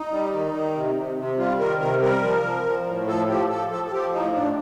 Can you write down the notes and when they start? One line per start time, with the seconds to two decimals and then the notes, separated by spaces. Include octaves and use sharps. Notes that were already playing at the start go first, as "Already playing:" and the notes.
Already playing: D#4
0.11 G3
0.32 D#3
0.54 D#3
0.75 C3
0.96 C3
1.17 C3
1.38 G3 F4
1.59 D#3 A#4
1.80 C3 A#4
2.01 G3 A#4
2.23 F3
2.44 F3
2.65 F3
2.86 A2
3.07 F3 A4
3.28 F3 G4
3.49 F3 A4
3.71 F3 A4
3.87 A4
3.92 F3 G4
4.13 A2 D#4
4.34 A2 D4